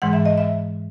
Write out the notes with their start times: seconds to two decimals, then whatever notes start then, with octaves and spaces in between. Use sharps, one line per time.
0.02 G#2 E3 G#3 F#5
0.13 E5
0.26 D#5
0.38 E5